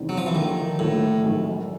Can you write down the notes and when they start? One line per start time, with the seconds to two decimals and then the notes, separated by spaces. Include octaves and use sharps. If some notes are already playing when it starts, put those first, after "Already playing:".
Already playing: E2 C3 D#3 G#3
0.09 F#3
0.18 F3
0.26 E3
0.34 D#2 D3 D#3 F3
0.79 D#2 A2 D3 F3
1.23 G#1 F#2 D#3